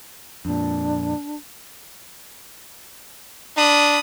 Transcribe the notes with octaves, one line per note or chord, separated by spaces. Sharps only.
F2 A#2 D4
D4 B5 D#6